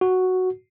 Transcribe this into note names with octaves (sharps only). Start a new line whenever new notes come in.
F#4